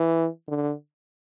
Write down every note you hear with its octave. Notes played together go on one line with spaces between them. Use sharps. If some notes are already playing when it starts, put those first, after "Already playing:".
Already playing: E3
D3